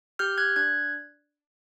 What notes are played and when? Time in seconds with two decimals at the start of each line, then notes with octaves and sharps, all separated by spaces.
0.19 G4 F6 G6
0.38 F#6 G#6
0.56 D4 F#6 G#6